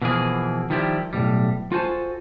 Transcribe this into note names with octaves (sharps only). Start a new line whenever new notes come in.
B2 E3 F3 A#3 G#4
D#3 F3 G3 E4 G4
B1 A2 C3 G3
F4 F#4 A4 C5 G#5 A5